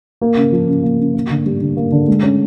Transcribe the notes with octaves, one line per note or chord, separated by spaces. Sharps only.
A#3
C#3
F3
C#3
A#3
C#3
A#3
D3
G3
D3
A#3
D3
G#3
C#4